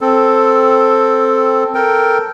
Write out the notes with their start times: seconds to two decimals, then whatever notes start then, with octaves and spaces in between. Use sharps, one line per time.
0.01 C4 A4
1.75 A4 A#4 G5